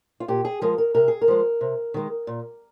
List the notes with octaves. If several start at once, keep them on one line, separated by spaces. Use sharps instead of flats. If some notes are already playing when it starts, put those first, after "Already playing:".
F4
A#2 G4
G#4
F3 G#3 A#4
A#4
C3 A#4
G#4
A#4
F3 G#3
C3
D#3 G#3
A#2